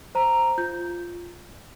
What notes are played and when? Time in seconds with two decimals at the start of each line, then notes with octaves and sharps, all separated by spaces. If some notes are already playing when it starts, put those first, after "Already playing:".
0.15 C5 A#5
0.58 F4 G6